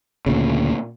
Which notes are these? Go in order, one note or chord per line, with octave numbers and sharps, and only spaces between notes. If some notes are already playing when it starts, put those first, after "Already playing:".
D2 A#2 C#3